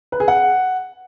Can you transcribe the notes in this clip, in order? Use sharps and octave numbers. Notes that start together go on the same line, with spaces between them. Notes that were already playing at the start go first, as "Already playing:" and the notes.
B4
G#4
F#5